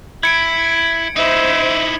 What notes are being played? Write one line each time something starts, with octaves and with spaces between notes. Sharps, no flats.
E4 G#6 C#7 D7
D#4 E4 C5 E5